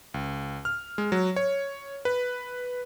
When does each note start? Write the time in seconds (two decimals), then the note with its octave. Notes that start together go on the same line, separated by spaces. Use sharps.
0.14 C#2
0.65 F6
0.98 G#3
1.12 F#3
1.36 C#5
2.05 B4